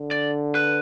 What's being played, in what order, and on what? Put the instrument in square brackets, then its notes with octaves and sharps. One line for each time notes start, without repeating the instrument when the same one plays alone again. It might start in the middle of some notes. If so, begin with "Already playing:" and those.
Already playing: [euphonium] D3
[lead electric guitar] D5
B4